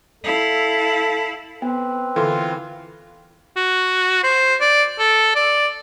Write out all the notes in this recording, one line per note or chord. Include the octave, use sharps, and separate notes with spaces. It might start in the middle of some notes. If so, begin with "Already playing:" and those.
E4 A4 F5
B3 C4 B4
D3 E3 E4 F4 A4 C6
F#4
C5
D5
A4
D5